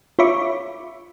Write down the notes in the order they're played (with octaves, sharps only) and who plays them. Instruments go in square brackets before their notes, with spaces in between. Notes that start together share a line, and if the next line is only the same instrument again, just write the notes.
[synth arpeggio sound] F4 C#5 E5 B5 C#6 D6